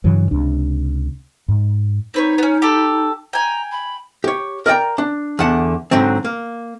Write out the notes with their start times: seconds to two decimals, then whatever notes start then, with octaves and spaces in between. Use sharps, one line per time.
0.04 G2 C#3 E3 F#3
0.31 C#2 C3 D4
1.48 G#2
2.14 C4 D#4 B4 C#5
2.38 B3 C#4
2.62 G4 A4
3.33 G5 G#5 A#5
3.72 B5
4.24 G4 C#5
4.66 A#4 D5 D#5 G5 A#5
4.98 D4
5.39 E2 D3 F#5 A5
5.91 G#2 D3 F#3 C4
6.25 A#3